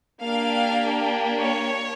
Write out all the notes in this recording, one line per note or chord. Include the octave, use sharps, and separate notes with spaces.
A#3 D4 G4 F5
C#5